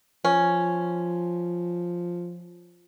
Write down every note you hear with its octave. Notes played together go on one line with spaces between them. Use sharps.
F3 C#4